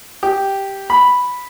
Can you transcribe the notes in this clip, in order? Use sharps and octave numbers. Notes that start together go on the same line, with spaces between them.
G4
B5